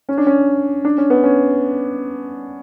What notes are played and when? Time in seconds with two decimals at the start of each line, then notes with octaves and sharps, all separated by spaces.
0.09 C#4
0.18 D4
0.27 C#4
0.85 D4
0.98 C#4
1.10 B3
1.23 C#4